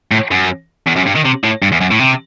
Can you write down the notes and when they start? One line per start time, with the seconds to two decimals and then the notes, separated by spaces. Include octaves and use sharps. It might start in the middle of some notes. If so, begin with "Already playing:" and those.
0.11 A2
0.31 F#2
0.87 E2
0.96 F#2
1.06 G2
1.15 D#3
1.25 C3
1.44 A2
1.63 G2
1.72 E2
1.81 F#2
1.91 A2
2.00 C3